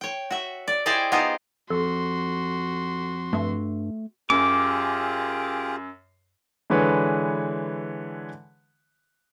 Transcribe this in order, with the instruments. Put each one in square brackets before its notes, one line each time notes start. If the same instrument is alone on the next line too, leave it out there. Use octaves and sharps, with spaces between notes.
[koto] C#5 G5
F#4 E5
D5
E4 G4 G#4 C5 D5 D#5
B3 D#4 F4 G4 G#4 C5
[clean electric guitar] F2 [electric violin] F#4 C6 [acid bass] A4
[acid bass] G2 [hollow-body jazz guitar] A3 E5
[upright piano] F#2 [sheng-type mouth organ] F4 G4 G#4 [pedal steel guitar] D6
[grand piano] D3 E3 G#3 B4 C#5